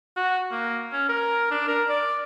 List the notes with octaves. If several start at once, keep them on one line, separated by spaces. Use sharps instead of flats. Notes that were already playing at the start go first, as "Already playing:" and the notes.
F#4
A#3
C#4
A#4
D4
A#4
D5